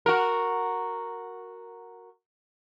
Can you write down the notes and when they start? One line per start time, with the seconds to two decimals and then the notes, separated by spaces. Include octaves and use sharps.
0.06 F#4 A#4